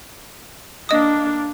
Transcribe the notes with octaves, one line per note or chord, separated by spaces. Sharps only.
A#3 D4 D#5 D#6